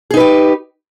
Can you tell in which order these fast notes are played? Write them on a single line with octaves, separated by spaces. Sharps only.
G#4 D#4 B4 G4